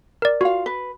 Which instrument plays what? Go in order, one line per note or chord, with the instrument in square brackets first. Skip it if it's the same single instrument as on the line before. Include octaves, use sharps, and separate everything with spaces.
[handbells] A#4 D5
[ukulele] F4 F5 [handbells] F#4
[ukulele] B4